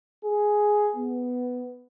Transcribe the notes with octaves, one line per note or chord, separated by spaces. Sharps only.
G#4
B3